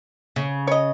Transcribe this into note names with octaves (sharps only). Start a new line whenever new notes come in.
C#3
C#5 D#5